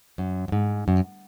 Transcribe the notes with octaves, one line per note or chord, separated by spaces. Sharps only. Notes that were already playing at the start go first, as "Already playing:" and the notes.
F#2
F#2
G#2
F#2